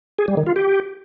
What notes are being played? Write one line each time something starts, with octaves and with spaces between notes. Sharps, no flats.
G#4
G3
D#3
F4
G4